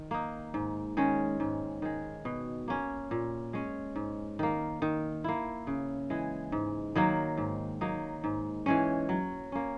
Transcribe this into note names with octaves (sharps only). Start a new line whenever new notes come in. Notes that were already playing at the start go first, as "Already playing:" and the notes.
Already playing: D#3
A#3 D#4
G#2
D#3 G#3 C#4
G#2
D#3 G#3
B2
A#3 C#4
A#2
G#3 C#4
G#2
D#3 A#3
D#3
A#3 E4
C#3
E3 G#3
G#2
D#3 F#3 A#3
G#2
F#3 A#3 D#4
G#2
E3 G#3 C#4
F#3
A#3 C#4